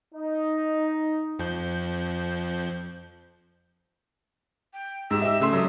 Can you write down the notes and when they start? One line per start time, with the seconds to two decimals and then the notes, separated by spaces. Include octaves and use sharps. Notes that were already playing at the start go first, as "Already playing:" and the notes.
0.14 D#4
1.39 F2 F3 G6
4.73 G5
5.11 G#2 G4 E6
5.22 G4 D#5 E5
5.40 C#3 A3 C6
5.53 F#3 A4 E5 D#6